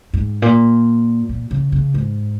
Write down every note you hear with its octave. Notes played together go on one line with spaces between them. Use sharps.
G#2
A#2
A#2
C#3
C#3
G#2